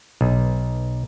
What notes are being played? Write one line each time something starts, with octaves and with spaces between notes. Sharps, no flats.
B1